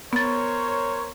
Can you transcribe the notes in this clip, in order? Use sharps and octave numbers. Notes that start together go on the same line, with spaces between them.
B3 A#4 C5 C#5 A6